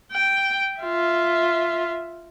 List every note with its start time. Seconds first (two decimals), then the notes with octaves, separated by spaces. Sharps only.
0.12 G5
0.80 F4 E5